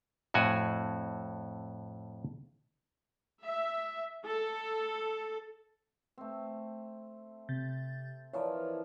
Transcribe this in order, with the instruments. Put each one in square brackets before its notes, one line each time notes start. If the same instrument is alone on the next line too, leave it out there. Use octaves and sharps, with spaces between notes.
[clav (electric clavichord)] F2 A2 F#4 G#5
[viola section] E5
A4
[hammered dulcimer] A3 C4
[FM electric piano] C3 G6 A6
[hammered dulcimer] E3 F3 A#4 [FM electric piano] C#5 D5